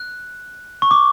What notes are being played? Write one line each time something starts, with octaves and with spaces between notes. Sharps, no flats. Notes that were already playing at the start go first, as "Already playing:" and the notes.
Already playing: F#6
C#6
D6